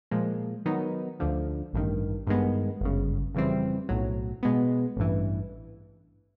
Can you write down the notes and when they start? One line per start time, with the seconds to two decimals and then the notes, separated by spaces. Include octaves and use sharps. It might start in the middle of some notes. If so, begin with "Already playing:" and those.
0.11 A#2 F3 G#3
0.66 D#3 F#3 B3 D#4
1.20 D2 D3 F3
1.73 A1 G2 D#3
2.27 G2 D#3 G#3 B3
2.81 G1 F#2 C#3
3.34 F2 C#3 E3 G3 C4
3.89 B1 A2 F#3
4.43 B2 G#3 B3
4.96 A1 G2 E3